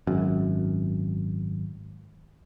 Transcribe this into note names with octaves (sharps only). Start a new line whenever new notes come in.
G#1 F#2